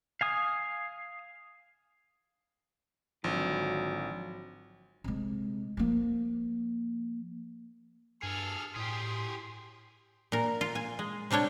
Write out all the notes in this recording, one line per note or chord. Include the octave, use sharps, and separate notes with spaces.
F5 G#5 D#6
G#1 D3 F3 F#3 F4
C3 G#3
F3 A#3
G2 G#4 A4 F6
A2 G4 G#4 C6
A#2 A#4
F4
G#5
G#3
C3 G3 D4 C#5 G5